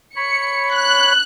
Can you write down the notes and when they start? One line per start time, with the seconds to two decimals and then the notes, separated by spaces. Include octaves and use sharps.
0.16 C#5 B5 C#7
0.74 F#6